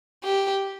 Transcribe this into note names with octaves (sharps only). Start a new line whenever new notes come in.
G4